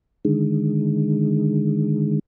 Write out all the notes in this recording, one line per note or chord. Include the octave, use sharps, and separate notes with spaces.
D3 D#3 G#3